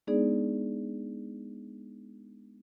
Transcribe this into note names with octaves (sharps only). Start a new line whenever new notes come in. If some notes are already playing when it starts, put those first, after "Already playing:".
G#3 B3 D4 D#4 G#4 D5